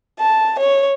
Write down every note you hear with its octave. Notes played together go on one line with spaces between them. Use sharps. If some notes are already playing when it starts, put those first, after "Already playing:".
A5
C#5